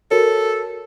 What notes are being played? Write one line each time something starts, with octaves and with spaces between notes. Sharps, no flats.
F#4 A4 A#4 C#5